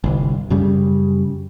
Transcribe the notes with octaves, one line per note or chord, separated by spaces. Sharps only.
G1 C2
F#2 C#3 G3